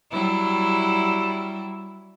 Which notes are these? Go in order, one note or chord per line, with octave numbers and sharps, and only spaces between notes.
F#3 G3 E4